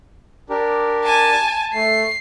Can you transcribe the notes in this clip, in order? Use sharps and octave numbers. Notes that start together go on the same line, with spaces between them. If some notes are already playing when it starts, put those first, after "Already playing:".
D4 G4 A#4
G#5 A5
A3 C7